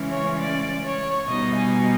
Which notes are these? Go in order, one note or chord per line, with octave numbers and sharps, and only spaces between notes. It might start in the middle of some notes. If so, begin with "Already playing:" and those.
Already playing: C#3 E3 G#3 C#4
C#5
D5
C#5
B2 G3 B3 D#4 D#5
G#5